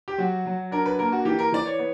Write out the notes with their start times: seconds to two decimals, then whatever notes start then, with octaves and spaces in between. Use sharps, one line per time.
0.08 G4
0.18 F#3 F#4
0.46 F#3
0.71 D4 A#4
0.86 B4
0.99 A#3 A#4
1.12 F#4
1.25 E3 G4
1.39 A#4
1.52 E3 D5
1.66 C#5
1.79 B3